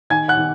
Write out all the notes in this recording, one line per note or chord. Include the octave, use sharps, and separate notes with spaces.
D#3 G#5 G#6
F#5 F#6
D#3